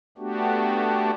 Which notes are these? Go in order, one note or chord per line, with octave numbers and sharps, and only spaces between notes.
A3 B3 D4 F#4 G4